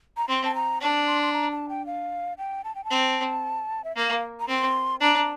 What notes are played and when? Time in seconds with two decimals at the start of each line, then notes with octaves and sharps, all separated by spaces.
0.17 A#5
0.28 C4 C6
0.45 A5
0.55 A#5
0.81 D4 A5
1.07 C6
1.22 C6
1.33 A#5
1.51 A5
1.69 G5
1.86 F5
2.38 G5
2.64 A5
2.75 G5
2.84 A5
2.90 C4
3.84 E5
3.96 A#3 F5
4.40 A#5
4.48 C4 C6
5.01 D4 A#5